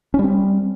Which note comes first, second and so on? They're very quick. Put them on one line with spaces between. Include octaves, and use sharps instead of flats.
C#4 G3 C4